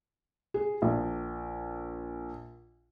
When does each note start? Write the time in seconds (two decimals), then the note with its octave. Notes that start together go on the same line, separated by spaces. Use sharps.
0.54 G#4
0.82 A#1